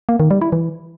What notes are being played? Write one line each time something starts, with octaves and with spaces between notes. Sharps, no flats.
A#3
D#3
G3
E4
E3